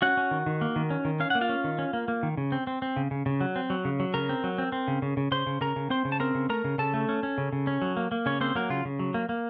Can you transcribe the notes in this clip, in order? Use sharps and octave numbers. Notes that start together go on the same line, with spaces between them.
C#4 F#4 F#5
C#4
D#3
D#3
A#3
D#3
C#4
D#3
C#4 F5
A#3 F#5
F4 F5
C#4
D#3
C#4
A#3
A#3
D#3
C#3
C4
C4
C4
C#3
C#3
C#3
F#3
C4
F#3
C#3
F#3
C#3 A#4 A#5
C4
F#3
C4
C4
C#3
C#3
C#3
C#3 C5 C6
C#3
C#3 A#4 A#5
C#3
C4 C5 C6
C#3
A5
C4 A#4 A#5
C#3
A3 A#4 A#5
C#3
C#3 A4 A5
A3
C#4
C#4
C#3
C#3
C#4
F#3
A#3
A#3
C#3 C#4 C#5
A#3 C4 C5
F#3 A#3 A#4
C#3 F4
C#3
F#3
A#3
A#3